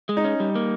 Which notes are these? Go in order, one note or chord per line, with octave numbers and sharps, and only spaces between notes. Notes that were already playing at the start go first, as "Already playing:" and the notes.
G#3
D#4
C#4
G3
A#3